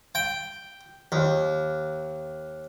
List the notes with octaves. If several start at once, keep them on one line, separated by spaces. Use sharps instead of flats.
G5
D#2